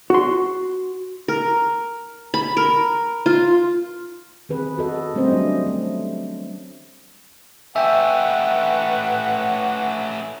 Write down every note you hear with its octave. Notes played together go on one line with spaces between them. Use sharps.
F#4 C6
A#4
B5
A#4
F4
D#3 C4 G#4 B4
F#4 A4 D#5
G3 A3 C4 C#4 C5 D#5
F#3 D4 D#5
A3
A3 C#4 B4 E5 F#5 G5